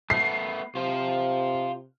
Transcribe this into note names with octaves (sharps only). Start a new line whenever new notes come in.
A3 B3 C7
C3 F4 C5